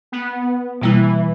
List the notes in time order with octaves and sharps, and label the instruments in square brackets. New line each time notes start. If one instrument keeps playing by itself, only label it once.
[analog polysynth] B3
[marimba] B2 G3 A#3 E4 [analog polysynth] E3